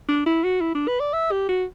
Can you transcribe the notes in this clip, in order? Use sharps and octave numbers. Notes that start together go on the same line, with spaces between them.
D4
E4
F#4
E4
D4
B4
D5
E5
G4
F#4